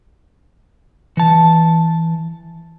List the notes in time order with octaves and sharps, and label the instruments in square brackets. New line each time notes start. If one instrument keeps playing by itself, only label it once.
[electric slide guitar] E3 A5